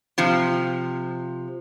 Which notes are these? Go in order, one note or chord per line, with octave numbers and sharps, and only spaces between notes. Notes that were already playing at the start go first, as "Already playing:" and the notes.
C3 F3